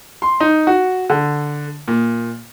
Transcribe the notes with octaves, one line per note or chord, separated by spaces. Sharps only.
C6
D#4
F#4
D3
A#2